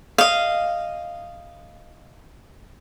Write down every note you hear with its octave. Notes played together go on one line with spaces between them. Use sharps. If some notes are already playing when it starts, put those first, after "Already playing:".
D#5 F5